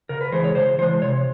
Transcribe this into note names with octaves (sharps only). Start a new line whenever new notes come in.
C#3 A#4
B4
E3 G#3 C5
C#5
C#3 C5
E3 G#3 C5
C3 C#5